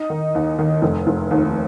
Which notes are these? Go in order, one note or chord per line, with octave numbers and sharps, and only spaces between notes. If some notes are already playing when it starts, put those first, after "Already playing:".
Already playing: D#4
D#3
D#2
D#3
F1
F1
D#2